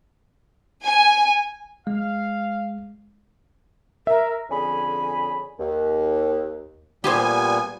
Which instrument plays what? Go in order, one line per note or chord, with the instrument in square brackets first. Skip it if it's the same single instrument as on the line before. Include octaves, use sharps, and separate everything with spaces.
[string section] G#5
[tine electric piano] G#3 [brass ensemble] F5
[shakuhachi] A#4 [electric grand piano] E5
[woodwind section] F2 D3 C#4 G#4 G#5 B5
D#2
[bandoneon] A#2 G3 B3 [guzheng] G4 G#4 C5 [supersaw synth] G#5